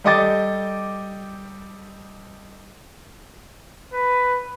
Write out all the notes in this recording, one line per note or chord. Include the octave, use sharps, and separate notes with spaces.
G3 A4 D#5 G5 D6 A6
B4